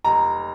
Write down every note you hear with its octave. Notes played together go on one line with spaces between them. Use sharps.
F1 A#5